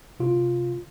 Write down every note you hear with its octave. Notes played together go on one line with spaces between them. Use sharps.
C3 F4